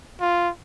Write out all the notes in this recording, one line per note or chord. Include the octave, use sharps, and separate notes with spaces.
F4